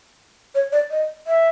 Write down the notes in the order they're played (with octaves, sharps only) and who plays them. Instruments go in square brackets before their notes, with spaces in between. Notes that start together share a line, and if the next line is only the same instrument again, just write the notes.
[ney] C#5
D5
D#5
E5